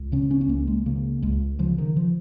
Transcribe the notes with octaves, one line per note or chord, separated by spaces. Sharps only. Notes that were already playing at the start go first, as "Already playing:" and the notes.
Already playing: C#2
C#3 C#4
C#4
C#4
C#2 A#3
G#3
C#3 A#3
C#2 G#3
C#3 F3
D#3
F3